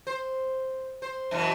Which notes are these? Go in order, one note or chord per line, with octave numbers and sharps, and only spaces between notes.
C5
C5
F#2 B2 E3